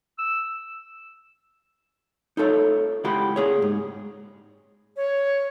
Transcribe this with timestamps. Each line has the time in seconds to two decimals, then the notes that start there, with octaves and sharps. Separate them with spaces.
0.19 E6
2.37 D#4 F4 A4 C#5
3.04 C#2 E4 F4 G4 F#5 B5
3.36 A#3 G#4 C#5
3.62 G#2
4.96 C#5